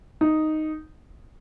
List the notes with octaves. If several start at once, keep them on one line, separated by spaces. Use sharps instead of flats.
D#4